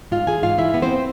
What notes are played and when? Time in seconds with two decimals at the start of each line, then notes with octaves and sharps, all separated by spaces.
0.11 G#2 F4 F5
0.27 E3 G#4 G#5
0.43 G#2 F4 F5
0.58 E3 E4 E5
0.74 B3
0.82 C4 C5